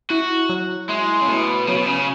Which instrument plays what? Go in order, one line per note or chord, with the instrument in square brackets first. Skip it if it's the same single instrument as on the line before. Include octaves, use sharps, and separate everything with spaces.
[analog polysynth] E4 [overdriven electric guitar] F#4
[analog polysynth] F#3
[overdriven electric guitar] G#3 [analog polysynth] E4
[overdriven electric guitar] C#3
[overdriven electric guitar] B2 [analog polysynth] A3
[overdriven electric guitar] C#3 [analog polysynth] F#3
[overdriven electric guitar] B2
C#3